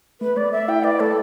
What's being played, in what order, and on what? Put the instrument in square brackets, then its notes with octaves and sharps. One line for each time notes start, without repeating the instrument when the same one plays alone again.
[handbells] A3 [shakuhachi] B4
[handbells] A3 [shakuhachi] D5
[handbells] A3 [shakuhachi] E5
[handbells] E4 [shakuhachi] G5
[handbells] B4 [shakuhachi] D5
[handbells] A3 [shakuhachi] A4